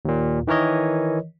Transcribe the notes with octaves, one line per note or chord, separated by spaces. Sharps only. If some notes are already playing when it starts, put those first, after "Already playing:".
D#2 A#2
D#3 E3 A#4 C#5 D#5